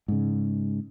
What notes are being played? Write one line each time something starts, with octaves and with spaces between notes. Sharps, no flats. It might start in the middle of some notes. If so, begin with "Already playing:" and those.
G#2 C#3